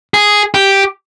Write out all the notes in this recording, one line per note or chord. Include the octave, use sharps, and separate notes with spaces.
G#4
G4